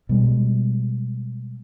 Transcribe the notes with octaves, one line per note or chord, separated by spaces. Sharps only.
B2 G3 G#3